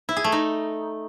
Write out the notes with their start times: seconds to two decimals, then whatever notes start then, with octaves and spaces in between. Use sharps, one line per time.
0.09 E4
0.17 G#4
0.24 A3
0.32 D#4